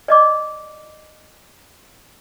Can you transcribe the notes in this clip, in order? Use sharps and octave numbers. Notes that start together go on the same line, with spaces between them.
D5 D#5 D6